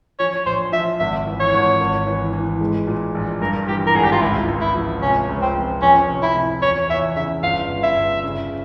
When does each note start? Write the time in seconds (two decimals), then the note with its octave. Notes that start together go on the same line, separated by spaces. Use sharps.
0.19 F3 C#5
0.46 A#1 C5
0.72 F3 E5
1.00 G#1 E5
1.27 E3
1.40 C#5
1.53 G#1
1.81 G#1
2.07 E3
2.33 E3
2.61 G#3
2.87 A#2
3.15 A#1
3.42 G2 A#4
3.68 E3 G4
3.87 A#4
3.94 G#1 G#4
4.04 G4
4.12 F4
4.21 C#2 E4
4.48 C#2
4.61 E4
4.75 F3
5.02 C3 C#4
5.29 C#2
5.42 C4
5.55 F3
5.82 F2 C#4
6.10 C3
6.23 E4
6.36 C3
6.62 E2 C#5
6.89 E2 E5
7.16 C#3 E5
7.42 G1 F5
7.69 G1
7.83 E5
7.96 G1
8.24 C#3